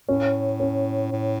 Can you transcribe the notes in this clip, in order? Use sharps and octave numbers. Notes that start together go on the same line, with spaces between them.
A2 C#4
C#4
A2